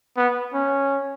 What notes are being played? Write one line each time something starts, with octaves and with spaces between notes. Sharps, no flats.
B3
C#4